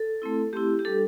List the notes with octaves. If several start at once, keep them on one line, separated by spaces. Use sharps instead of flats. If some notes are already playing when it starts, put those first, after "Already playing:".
Already playing: A4
A3 C4 E4
A3 C4 E4 G4
G4
G3 D4 A4